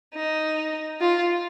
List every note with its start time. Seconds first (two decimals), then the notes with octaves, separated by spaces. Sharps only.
0.14 D#4
1.01 F4